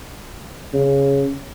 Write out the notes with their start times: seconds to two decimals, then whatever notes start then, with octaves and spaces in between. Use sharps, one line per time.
0.73 C#3